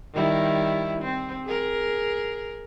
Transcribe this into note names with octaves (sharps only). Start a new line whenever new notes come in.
D#3 G3 E4
C4
G#4 A#4